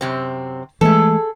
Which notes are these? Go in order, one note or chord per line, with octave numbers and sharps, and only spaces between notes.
F#2 C3 C4
E3 G#3 A3 G#4 A4